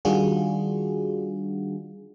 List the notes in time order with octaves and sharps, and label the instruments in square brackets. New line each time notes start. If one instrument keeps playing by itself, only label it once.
[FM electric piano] D#3 G3 D4 F4 F#4 G#4